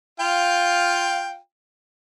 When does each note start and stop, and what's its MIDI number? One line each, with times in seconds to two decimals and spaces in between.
0.20 1.37 65
0.20 1.37 77
0.20 1.37 79